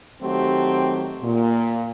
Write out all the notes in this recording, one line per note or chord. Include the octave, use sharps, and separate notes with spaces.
D#3 F#3 A3 C4 G4
A#2